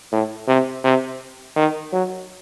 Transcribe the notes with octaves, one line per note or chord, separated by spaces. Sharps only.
A2
C3
C3
D#3
F#3